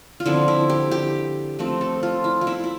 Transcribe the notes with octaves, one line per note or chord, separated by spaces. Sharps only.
F4
D3 F3 C4 E4
E4
G4
G4
F3 A3 C4
A4
F4
E4
F4
E4
E4